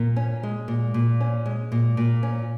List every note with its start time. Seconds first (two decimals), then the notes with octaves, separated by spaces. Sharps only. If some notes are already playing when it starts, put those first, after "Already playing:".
Already playing: A#2
0.16 C#4
0.43 G#3
0.68 A#2
0.94 A#2
1.20 C#4
1.46 G#3
1.72 A#2
1.97 A#2
2.23 C#4